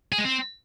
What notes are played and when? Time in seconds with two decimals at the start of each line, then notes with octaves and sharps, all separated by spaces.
0.12 G#4
0.18 G#3
0.25 C4